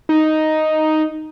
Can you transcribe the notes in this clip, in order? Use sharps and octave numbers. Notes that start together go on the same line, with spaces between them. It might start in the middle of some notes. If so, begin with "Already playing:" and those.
D#4